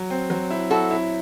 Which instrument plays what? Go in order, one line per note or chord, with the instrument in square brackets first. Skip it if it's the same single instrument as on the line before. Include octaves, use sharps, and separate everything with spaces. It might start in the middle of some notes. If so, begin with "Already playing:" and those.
Already playing: [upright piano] F#3
C4
F#3
E4
[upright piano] E4 [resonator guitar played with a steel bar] F#4 A4
[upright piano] E4